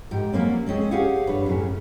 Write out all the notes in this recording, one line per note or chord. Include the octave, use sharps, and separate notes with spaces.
G#2 G4 G5
F#3 G3 A#3 C4 C#4
G#3 C4 C#4 G#4
G4 G#4 C#5 F5 F#5
G2 D4 B4 C#5 A5
F#2 A2 C#3 C#4